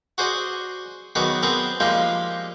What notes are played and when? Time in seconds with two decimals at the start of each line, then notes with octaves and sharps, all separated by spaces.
0.18 F#4 G#4 C5 D5 D#5
1.15 D#3 F#3 B3 G#4 D5
1.43 B3 C4 G#4 A#4
1.80 F3 G3 G#3 A#3 D#4 F4